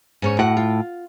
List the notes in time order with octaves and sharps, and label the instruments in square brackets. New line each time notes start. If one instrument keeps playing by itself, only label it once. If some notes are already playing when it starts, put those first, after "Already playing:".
[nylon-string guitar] G#2 C#4 C#5
[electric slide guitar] A2 [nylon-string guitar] F#4 F#5
[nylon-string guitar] F4